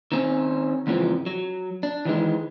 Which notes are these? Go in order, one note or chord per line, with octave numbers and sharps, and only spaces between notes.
D#3 C4 C#4
E2 G#2 C#3 E3 F3 C4
F#3
D4
D#3 E3 G#3